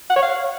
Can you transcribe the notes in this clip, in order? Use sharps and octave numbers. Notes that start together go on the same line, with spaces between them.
F#5
C#5
F5